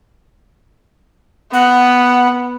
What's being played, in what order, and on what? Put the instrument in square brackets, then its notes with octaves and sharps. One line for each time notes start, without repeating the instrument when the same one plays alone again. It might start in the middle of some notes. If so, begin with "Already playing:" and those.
[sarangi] B3 [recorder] F#5